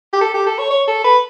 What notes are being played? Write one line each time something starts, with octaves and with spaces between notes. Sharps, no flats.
G4
A4
G4
A4
C#5
C#5
A4
B4